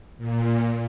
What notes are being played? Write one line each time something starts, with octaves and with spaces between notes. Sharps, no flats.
A#2